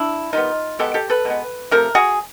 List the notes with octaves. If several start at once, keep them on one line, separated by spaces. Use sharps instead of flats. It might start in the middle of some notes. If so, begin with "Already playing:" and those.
Already playing: D4 E4
D#3 G3 B3 D#4 F4
B2 G#3 B3 G4 A4
G4 A4
A4 B4
B2 G#3 B3
C3 F3 A3 A#4
F#4 G#4